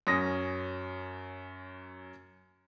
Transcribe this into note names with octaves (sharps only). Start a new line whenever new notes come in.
F#2 C#4 D#6 A#6